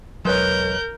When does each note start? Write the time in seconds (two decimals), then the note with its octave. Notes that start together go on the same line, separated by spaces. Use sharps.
0.25 E1 F#3 G#3 A#4 B4 C#5 G6